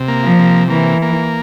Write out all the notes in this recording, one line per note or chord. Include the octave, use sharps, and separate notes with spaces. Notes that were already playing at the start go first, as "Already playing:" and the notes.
Already playing: C3
A#3
F3
C3
E3 A#3
A#3